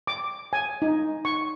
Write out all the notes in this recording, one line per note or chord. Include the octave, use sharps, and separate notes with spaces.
D6
G#5
D#4
C#6